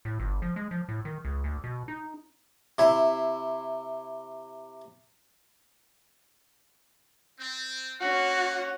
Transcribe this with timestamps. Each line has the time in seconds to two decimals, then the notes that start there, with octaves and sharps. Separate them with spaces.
0.05 A2
0.20 G1
0.42 F3
0.56 G#3
0.71 F3
0.89 A2
1.05 D#3
1.25 C#2
1.44 D2
1.64 B2
1.88 D#4
2.79 C3 E4
7.38 C4
8.01 A#3 C#4 F#4 C#5 F5 F#5